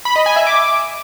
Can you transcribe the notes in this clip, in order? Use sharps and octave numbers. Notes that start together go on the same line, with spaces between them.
B5
D#5
G#5
E5
D6